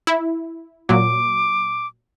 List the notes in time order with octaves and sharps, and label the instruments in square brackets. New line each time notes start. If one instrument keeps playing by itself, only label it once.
[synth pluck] E4
[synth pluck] A#2 F#3 [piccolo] D6